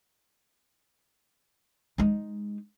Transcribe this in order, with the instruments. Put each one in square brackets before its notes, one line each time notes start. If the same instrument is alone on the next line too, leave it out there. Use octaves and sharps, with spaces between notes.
[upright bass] G#3 D#4